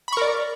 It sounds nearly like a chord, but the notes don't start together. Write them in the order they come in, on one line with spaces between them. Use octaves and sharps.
B5 C#6 A#4 D5